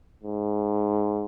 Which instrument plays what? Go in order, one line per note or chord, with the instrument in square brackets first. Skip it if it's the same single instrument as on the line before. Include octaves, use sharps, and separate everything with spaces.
[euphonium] G#2